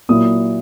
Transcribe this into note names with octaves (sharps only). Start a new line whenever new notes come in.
A#2 F#3 A#3 E4 D#6